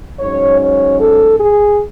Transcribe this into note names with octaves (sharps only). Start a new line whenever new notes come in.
G#2 F#3 C#4 C#5
C#5
A4
G#4